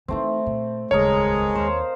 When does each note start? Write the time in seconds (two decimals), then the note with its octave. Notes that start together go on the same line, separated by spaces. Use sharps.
0.08 E3 A3 C4 D#4
0.46 A#2
0.91 D#1 C#2 G#3 A4 A#4 C#5 D#5
1.55 D#2 A#3 C5 F5